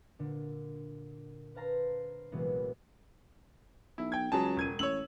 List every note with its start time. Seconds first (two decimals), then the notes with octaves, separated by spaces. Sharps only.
0.19 A#2 D3
1.55 B4 C5 F5 A5 A#5 C6
2.32 C2 A#2 E3 F#3 G#3 B3
3.98 B1 E4
4.12 G5 G#6
4.32 C#2 F#3 G#4 A5
4.56 E1 G#6 D#7
4.79 A1 C#5 E6 F#7